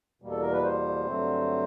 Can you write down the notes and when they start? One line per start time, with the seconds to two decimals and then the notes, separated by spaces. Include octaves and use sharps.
0.22 E2 B2 G3 A#3
0.31 A4
0.42 A#4
0.53 B4
0.64 C5
1.06 G2 D3 F#3 A3 C4